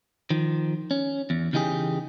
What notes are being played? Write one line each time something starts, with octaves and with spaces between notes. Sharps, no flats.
D#3 F3
C#4
E2
C#3 E3 D#4 G4 G#4